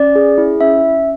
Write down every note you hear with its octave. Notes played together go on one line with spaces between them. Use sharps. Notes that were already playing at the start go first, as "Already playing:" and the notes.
Already playing: C#4 D5
G#4
E4
C#4 E5
C#4